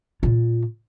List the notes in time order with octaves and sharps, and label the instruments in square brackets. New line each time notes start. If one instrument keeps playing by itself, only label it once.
[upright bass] A#2 F4